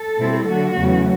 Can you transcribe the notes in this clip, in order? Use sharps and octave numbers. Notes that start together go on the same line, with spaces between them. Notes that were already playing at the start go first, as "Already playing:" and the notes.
Already playing: A4
B2 G3 C4 E4
D3 F#3 A3 F#4
E2 C#3 F#3 A3